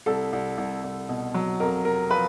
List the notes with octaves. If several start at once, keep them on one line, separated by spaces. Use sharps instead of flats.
C2 A4
C2
C2
C2
B2
F#3
F2 A#4
C3 A#4
F3 B4